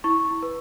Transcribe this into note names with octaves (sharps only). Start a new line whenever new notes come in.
E4 C#6
B4